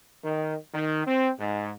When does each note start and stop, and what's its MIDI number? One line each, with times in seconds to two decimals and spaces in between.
0.24 0.55 51
0.74 1.07 51
1.07 1.30 60
1.40 1.72 44